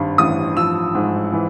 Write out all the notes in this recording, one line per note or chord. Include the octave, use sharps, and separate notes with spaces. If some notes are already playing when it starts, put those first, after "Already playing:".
Already playing: G#1 G2
A1 D#6
F3 E6
G#2
E3